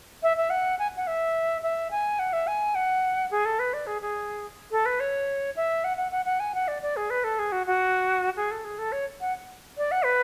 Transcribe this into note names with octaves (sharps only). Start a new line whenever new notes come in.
E5
E5
F#5
G#5
F#5
E5
E5
G#5
F#5
E5
G#5
F#5
G#4
A4
B4
D5
G#4
G#4
A4
B4
C#5
E5
F#5
F#5
F#5
F#5
G#5
F#5
D5
D5
G#4
B4
A4
G#4
F#4
F#4
G#4
A4
G#4
A4
C#5
F#5
D5
F#5
B4